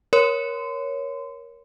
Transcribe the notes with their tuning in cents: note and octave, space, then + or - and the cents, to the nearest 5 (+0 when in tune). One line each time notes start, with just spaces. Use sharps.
A#4 +20 C#5 +0 C6 -30